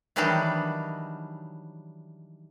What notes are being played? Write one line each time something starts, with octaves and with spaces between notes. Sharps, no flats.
D#3 E3 F#3 G3 D4 D#4